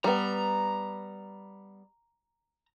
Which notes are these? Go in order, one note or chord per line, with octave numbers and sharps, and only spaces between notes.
G3 B3 A#5